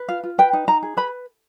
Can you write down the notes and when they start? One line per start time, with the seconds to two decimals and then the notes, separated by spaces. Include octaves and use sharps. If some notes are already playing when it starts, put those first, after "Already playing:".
Already playing: B4
0.08 F4 F5
0.24 F4
0.38 B4 G5
0.53 D#4
0.68 D#4 A#5
0.83 G#4
0.97 B4 B5